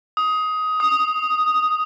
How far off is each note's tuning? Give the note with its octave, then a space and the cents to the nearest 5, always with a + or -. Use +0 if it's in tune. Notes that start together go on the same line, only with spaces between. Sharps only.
D#6 +15
D#6 +0